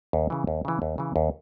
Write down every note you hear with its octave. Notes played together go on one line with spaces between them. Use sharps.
D#2
C#3 E3
D#2
C#3 E3
D#2
C#3 E3
D#2